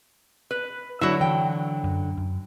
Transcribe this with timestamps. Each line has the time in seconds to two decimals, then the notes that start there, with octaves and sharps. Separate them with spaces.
0.51 B4
1.01 D3 F#3 D4 E4 F#4
1.21 E3 G5
1.84 F#2
2.17 F#2